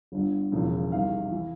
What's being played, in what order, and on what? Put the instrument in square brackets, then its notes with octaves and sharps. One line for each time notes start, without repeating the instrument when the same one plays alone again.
[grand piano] G1 G2 D3
E1 E2 C#3 F3
C2 C3 D#3 F5
E3